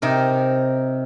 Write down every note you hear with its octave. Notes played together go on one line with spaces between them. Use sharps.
C3 D#4 A#4